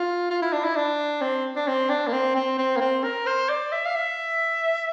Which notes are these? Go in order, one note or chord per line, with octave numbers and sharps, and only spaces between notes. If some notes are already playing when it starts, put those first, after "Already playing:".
Already playing: F4
F4
E4
D4
E4
D4
C4
D4
C4
D4
A#3
C4
C4
C4
A#3
C4
A#4
C5
D5
E5
F5
E5